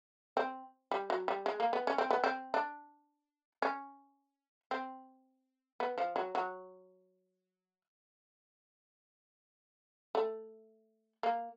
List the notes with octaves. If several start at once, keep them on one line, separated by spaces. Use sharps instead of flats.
C4
G3
F#3
G3
G#3
A#3
B3
C#4
C4
B3
C4
D4
C#4
C4
B3
F3
F#3
F#3
A3
A#3